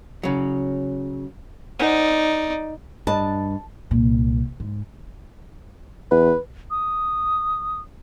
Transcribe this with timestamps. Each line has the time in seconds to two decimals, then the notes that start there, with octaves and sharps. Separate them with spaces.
0.23 C#3 F#3
1.79 D#4 C5 D5 F#5 G#5
3.07 G2 D4 D#5 A5 B5
3.91 C2 A#2
4.60 G#2
6.11 E2 B4
6.70 D#6